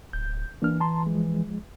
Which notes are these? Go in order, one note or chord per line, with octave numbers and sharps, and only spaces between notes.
D1 G6
E3 A#3 D4 F6
A5 A#5 C6
F3 G#3